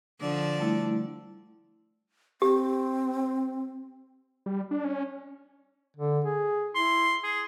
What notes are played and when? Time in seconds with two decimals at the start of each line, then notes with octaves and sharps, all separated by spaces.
0.21 D3 F3 D5
0.59 G3 A3 E4
2.42 C4 G4
4.46 G3
4.71 D4
4.85 C#4
5.97 D3
6.24 G#4
6.75 E4 C6
7.24 G#4